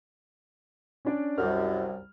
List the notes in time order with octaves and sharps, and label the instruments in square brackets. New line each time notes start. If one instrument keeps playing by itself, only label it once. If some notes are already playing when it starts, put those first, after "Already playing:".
[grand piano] C#4 D4 D5
[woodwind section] C2 F#2 [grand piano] G3 F6